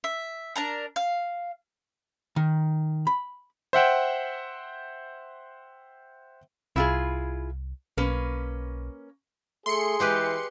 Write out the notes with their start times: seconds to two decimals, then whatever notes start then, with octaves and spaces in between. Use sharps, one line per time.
0.04 E5
0.56 D4 A#4 A#5
0.96 F5
2.36 D#3
3.07 B5
3.73 C5 E5 F#5 G5
6.76 C2 E4 F4 G#4
7.97 B1 A#3 C#4 B4
9.66 A3 G#4 C6 C#7
10.00 E3 G#3 G4 B4